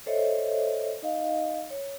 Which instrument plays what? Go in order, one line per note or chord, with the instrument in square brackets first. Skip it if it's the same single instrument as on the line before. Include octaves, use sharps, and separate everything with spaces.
[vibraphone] A4 C5 C#5 D#5 E5
D#4 D#5 F5
C#5